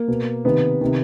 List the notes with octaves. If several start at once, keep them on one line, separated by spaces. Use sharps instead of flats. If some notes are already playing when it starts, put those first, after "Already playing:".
Already playing: A#3
B2
C3 D#3 B3
C3 D#3